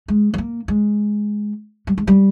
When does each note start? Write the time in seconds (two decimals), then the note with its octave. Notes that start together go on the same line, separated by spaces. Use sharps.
0.08 G#3
0.34 G#3
0.38 A#3
0.68 G#3
1.87 G3
1.98 G#3
2.07 G3